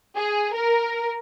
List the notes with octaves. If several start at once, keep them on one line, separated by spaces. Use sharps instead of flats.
G#4
A#4